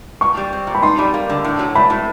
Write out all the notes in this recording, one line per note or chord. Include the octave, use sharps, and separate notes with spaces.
A#2 C#6
G3
C4
A#2
B5
D#4 C6
G3 B5
A#3
D3
A2
F#3
A3 B5
A2